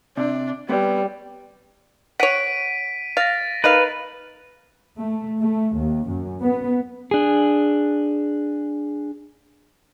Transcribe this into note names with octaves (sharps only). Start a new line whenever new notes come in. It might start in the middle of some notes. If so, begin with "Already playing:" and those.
C3 D4
G3 B3 B4 C#5
C#5 F#5 B6 D7 D#7
F5 A6 A#6
D#4 A#4 B4 F5
A3
A3
D#2
F#2
B3
D4 G#4